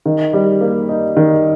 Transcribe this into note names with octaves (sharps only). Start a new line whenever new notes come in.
D#3
G3
A#3
D#4
D#3